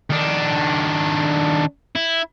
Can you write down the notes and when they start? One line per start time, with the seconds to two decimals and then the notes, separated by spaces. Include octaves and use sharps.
0.10 D#3 D4
1.96 E4